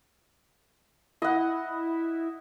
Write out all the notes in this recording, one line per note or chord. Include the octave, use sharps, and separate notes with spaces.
E4 D#5 F#5